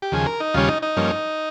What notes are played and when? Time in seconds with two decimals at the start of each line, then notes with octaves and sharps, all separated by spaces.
0.02 G4
0.12 D#2 C#3 F3 G#4
0.26 A#4
0.40 D#4
0.54 D#2 C#3 G3 C#4 F4
0.68 D#4
0.82 D#4
0.97 G2 F3 A#3 C#4